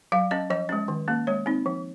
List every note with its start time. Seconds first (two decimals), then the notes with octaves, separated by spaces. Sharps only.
0.12 F#3 F5
0.31 C#4 D#5
0.50 F3 D#5
0.69 G#3 C#4
0.88 D#3
1.08 A#3 C#4
1.27 G#3 C#5
1.46 C4 D#4
1.66 F3